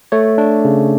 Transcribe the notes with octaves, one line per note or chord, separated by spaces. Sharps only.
A3 C#5
D4
C#3